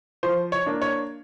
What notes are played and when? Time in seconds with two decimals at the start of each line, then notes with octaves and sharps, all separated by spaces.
0.23 F3 C5
0.52 C#5
0.66 A#3 D4
0.82 C#5